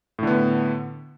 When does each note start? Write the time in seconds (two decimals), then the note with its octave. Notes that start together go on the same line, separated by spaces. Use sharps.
0.19 A2
0.23 D3
0.27 B3